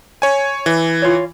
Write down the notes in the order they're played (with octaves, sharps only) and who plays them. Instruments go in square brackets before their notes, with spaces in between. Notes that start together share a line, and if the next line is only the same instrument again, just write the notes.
[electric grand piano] C#5 G#5
E3
[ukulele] F4 C#5